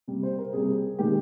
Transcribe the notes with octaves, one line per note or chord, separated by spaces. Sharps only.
C3 G3
C5
A#4
C3 G3 G#4
D#3 G#3 G4